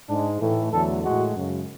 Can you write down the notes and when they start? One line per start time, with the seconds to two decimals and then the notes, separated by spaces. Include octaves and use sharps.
0.09 G#2 G#3 D4
0.40 A2 E3 A3
0.72 E2 D3 F#3 A3 A4
1.02 A2 G#3 F#4
1.34 F#2 C#3 G#3